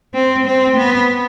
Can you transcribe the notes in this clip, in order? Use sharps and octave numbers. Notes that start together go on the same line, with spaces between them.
C4
C4
B3